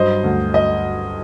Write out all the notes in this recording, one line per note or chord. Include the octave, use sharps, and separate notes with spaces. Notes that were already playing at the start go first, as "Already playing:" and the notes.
Already playing: G2 F#3 C5 D#5
D2
D#5